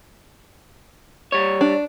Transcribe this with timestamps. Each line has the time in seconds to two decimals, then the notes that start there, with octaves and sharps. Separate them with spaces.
1.32 G3 C#5
1.61 D4